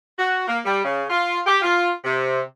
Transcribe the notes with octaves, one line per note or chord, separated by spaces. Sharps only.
F#4
A#3
G3
C#3
F4
G4
F4
C3